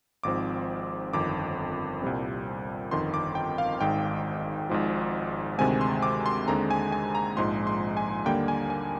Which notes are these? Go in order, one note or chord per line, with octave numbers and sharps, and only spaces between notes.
G#1 G#2 F3 C4 D6
G1 F2 D#3 D6
C2 A#2 G3 C4
G1 F2 D#3 C6
D6
G5
F5
G#1 G#2 D#3 G5
G#1 G#2 F3
D2 C3 D#3 G#3 C4 G#5
C6
D6
C6
D#2 D3 G#3 C4 A#5
G#5
G#5
A#5
A#1 G#2 F3 G#3 C6
C6
G#5
D#2 D3 G3 A#3 G5
G#5
G#5